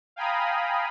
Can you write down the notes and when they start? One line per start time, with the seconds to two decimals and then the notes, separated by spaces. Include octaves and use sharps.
0.16 F5 G5 G#5 A#5 B5 D#6